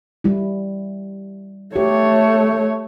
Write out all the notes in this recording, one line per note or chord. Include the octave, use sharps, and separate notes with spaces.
G3 E4
A3 G4 C#5